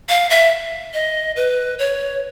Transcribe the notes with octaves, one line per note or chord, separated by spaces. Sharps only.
F5
E5
D#5
B4
C#5